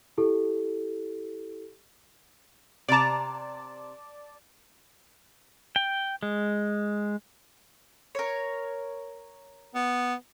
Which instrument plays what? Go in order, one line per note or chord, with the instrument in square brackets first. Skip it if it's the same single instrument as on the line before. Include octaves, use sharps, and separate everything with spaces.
[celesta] E4 G4 A4
[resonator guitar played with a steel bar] C3 A#5 [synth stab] D5 A5
[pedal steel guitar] G5
G#3
[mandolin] A#4 C#5
[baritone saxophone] B3